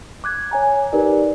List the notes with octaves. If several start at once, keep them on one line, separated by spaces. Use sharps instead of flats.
D6 F#6 G#6
C#5 G#5 A#5
D#4 G4 A#4 B4 D5